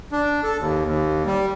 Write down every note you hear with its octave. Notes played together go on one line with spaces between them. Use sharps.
D4
A4
D#2
D#2
G3